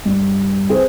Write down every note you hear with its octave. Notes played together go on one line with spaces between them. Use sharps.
G2
C4 G#4 B4 C5